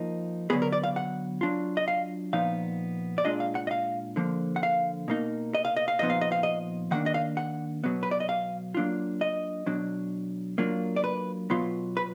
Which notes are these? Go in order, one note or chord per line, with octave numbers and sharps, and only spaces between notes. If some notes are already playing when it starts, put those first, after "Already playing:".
Already playing: F3 A#3 D#4
D3 F#3 B3 G#4
A#4
D5
F5
F#5
F#3 D4 F4
D#5
F5
A#2 F3 B3 D#4 F5
D5
A#2 G#3 D4 F4 D#5
F5
F#5
D#5
F5
D3 F3 A#3
F#5
F5
B2 A#3 D#4
D#5
F5
D#5
F5
A#2 F3 B3 D#4 D#5
F5
D#5
F5
D#5
D#3 A#3 D4 F#5
D#5
F5
F#5
B2 F#3 B3
B4
D5
D#5
F5
F#3 A#3 D4 F4
D#5
B2 F#3 D4
F#3 A#3 D4 F4
D5
B4
B2 F#3 B3 F4
B4